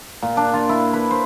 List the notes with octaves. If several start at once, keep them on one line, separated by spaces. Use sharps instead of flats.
A#2
D4
F4
E4
B4
C5